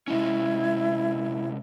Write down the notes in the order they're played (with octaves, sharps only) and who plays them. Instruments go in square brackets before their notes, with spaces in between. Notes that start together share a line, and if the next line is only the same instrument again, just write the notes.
[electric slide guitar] C3 G#3 C#4 [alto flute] E4